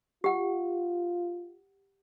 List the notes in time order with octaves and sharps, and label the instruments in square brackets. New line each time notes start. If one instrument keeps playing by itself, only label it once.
[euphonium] F4 [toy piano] G4 F#5